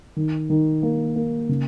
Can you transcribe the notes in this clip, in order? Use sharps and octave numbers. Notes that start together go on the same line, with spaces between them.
D#3
D#3
A#3
A#3
C#3